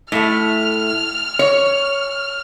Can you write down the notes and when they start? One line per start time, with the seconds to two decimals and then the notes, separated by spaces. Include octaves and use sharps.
0.12 A2 A3 F6
1.39 C#5